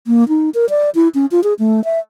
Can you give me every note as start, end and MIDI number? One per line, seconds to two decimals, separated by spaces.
0.07 0.27 58
0.29 0.50 63
0.54 0.66 70
0.70 0.90 74
0.95 1.08 64
1.15 1.26 61
1.31 1.43 65
1.44 1.54 68
1.59 1.84 57
1.84 1.99 76